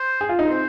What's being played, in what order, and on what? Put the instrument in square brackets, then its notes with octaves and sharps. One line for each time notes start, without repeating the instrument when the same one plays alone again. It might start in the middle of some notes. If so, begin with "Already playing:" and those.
Already playing: [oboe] C5
[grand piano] G#4
F4
D#4
[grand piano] C4 [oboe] C5